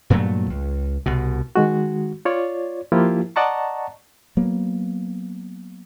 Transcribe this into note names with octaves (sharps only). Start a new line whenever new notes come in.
G2 A#2 F#3 A3
C#2
C2 B2
D#3 G#3 F#4
F4 C#5 D5
F3 A#3 E4 F4 G4
D5 D#5 F#5 A5 A#5 C#6
F#3 A#3 B3